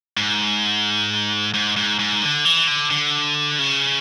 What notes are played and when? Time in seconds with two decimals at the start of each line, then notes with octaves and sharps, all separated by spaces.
0.17 G#2
1.54 G#2
1.77 G#2
1.99 G#2
2.22 D3
2.45 E3
2.67 D3
2.91 D3
3.59 C#3